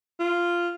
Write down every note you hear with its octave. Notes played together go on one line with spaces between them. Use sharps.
F4